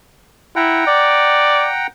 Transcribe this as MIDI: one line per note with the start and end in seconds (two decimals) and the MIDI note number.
0.56 0.83 64
0.56 1.87 78
0.56 1.87 79
0.56 1.87 82
0.87 1.69 74